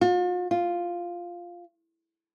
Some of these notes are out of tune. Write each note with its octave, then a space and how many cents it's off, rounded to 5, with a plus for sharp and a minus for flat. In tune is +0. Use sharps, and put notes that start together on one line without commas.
F4 +45
F4 +0